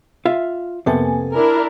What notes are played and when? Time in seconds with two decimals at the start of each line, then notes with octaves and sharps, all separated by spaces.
0.25 F4 E5 F5
0.86 F2 C3 A#3 B3 A4 G#5
1.34 D4 E4 A#4